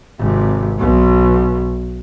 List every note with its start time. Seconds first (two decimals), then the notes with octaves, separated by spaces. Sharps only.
0.19 G#1 C3
0.78 B1 B2